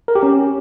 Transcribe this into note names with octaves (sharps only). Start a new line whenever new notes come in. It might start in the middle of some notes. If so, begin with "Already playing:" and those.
A#4
G4
C#4